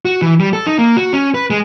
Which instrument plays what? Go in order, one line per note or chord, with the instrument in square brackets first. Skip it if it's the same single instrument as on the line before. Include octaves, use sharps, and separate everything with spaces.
[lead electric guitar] F#4
E3
G3
A4
D#4
A#3
F#4
C#4
B4
G#3